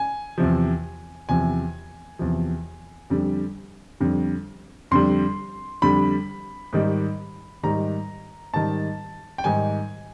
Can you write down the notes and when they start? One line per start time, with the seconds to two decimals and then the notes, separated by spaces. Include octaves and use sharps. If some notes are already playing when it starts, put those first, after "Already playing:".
Already playing: G#5
0.38 E2 C3 F3
1.29 E2 C3 F3 G#5
2.19 E2 C3 F3
3.10 F2 D3 G3
4.00 F2 D3 G3
4.91 F2 D3 G3 C6
5.82 F2 D3 G3 B5
6.73 G#2 D#3 G3
7.63 G#2 D#3 G3 A#5
8.53 G#2 D#3 G3 A5
9.38 G5
9.44 G#2 D#3 G3 G#5